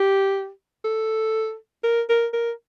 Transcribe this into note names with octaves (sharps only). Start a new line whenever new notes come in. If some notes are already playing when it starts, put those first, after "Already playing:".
Already playing: G4
A4
A#4
A#4
A#4